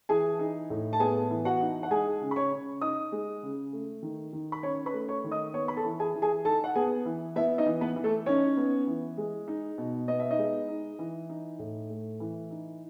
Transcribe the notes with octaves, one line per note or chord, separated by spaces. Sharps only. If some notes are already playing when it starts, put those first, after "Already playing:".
E3 G#4 G#5
D#4
A2
A5
B3 G#4 G#5
E3
F#4 F#5
D#4
F#5
G#3 G#4 G#5
C#3
B5
C#5 C#6
C#3
D#4 D#5 D#6
G#3
C#3
A3
D#3
D#3
B5
C#4 C#5 C#6
B4 B5
A3
C#5 C#6
D#3
D#5 D#6
B3 C#5 C#6
B5
A4 A5
E3
G#4 G#5
E3
G#4 G#5
D#4 A4 A5
F#5
B3 G#4 G#5
E3
B3 E4 E5
D#4 D#5
E3
B3 B4
E3
A3 A4
C#4 D#4 C#5
B3
E3
G#3
D#4
B2
B3 D#5
E5
D#4 D#5
G#3
D#4
E3
D#4
A2
A3
E3
D#4